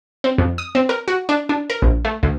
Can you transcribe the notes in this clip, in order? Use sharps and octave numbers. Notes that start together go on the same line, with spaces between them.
C4
F2
D#6
C4
A#4
F#4
D4
D4
A#4
A#1
A3
D2